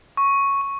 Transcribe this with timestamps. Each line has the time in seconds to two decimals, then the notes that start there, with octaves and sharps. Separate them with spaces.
0.17 C#6
0.61 C#6